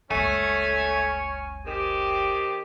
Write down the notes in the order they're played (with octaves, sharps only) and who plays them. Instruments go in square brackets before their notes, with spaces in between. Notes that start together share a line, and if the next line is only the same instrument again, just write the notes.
[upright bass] F#1 C#2 [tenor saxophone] A3 [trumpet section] C#4 C#5 [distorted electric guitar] G#5
[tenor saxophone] D#3 [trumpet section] C4 G4